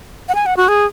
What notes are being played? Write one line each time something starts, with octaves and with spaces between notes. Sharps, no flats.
F#5
G#5
F#5
F#4
G#4